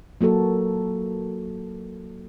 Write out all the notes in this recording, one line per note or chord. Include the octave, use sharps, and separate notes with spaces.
F#3 A#3 F#4 A4